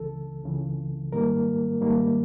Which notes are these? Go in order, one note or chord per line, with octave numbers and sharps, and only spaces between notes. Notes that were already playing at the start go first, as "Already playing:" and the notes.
Already playing: C#2 C#3 E3 A4
C#2 C#3 E3
G#2 D#3 G3 A#3 A#4
G#2 D#3 G3 A#3